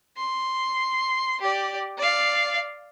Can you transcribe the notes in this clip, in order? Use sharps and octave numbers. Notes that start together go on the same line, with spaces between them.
C6
G4 D5
D5 F5